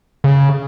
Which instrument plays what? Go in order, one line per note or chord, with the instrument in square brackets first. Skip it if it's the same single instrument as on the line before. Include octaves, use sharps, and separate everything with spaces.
[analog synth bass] C#3